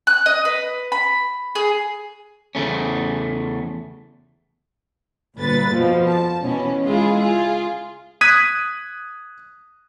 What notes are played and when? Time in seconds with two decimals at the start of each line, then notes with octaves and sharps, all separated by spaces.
0.07 F#6
0.26 D#5
0.45 B4
0.92 B5
1.55 G#4
2.55 E2 C#3 A3 C#4
5.38 G1 A#2 B4 A6
5.73 F2 B2 F3
6.07 A5
6.41 B2 E3 C#4
6.85 C#2 G#3 E4 F4 G#4
7.17 F4 G#4
8.21 D#6 F#6 G#6 B6 D#7